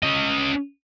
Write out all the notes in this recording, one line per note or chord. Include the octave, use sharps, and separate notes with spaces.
C#4 D#5